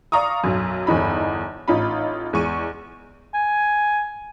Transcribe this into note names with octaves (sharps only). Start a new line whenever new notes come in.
D5 F5 A#5 C#6 D#6
B1 F#2
G1 E2 D#4 B5
A1 D#4 F4 B5
E2 G#3 C#6 D#7
G#5